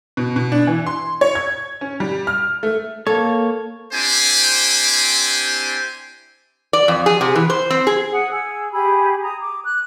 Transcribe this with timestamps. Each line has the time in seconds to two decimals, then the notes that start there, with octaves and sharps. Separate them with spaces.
0.17 B2
0.36 B2
0.52 D4
0.67 E3
0.86 C6
1.21 C#5
1.35 G#6
1.81 C#4
2.00 G3
2.27 F6
2.63 A3
3.07 A#3 A4 C#5
3.93 C4 D4 E4 G4 C5 G#5
6.73 D5
6.88 F2
7.06 G#4
7.21 C3
7.36 E3
7.50 C5
7.70 C4
7.87 G#4
8.13 F#5 D#6
8.31 G#4 E6
8.72 G4 G#4 B5
9.23 A#5 D#6
9.41 D6
9.65 F#6